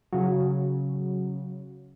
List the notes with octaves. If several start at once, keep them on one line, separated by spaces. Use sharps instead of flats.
C#3 F#3